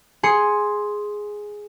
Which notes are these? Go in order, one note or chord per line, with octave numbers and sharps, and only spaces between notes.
G#4 C6 C#7